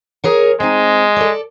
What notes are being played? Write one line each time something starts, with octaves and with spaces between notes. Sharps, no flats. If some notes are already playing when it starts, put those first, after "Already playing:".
G#4 A#4 C#5
G#3 C4 D#4
A4 D5